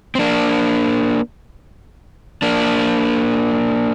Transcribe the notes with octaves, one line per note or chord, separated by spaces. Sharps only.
C4
A#3 D4
A#3 D4